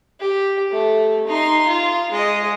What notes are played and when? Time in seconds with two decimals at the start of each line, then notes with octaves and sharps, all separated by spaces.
0.21 G4
0.72 A3
1.28 D#4 C6
1.67 F4
2.11 G#3 D#5